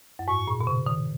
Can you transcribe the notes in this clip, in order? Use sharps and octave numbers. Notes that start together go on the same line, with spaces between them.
F#2
G#2 C#6
A#2
B2
C#3
D#3